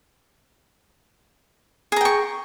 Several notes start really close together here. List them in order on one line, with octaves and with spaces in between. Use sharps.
G#4 A#5 G5 C#6